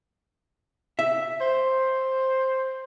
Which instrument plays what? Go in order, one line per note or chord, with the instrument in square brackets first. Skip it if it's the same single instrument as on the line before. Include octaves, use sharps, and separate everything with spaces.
[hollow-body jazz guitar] E5
[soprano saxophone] C5